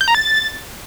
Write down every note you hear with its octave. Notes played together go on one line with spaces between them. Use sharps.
G6
A#5
A6